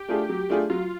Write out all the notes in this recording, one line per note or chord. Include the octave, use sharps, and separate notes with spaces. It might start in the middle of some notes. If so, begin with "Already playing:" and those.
Already playing: G4
A3 D4 F4 G#4
F#3
A3 D4 F4 G#4
F#3 F4